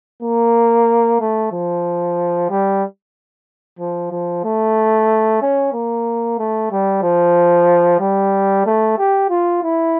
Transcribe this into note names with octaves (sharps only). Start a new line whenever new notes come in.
A#3
A3
F3
G3
F3
F3
A3
C#4
A#3
A3
G3
F3
G3
A3
G4
F4
E4